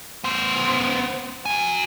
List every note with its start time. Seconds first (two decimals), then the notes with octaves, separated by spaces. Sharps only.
0.24 B3 C5
1.46 F#4 G#5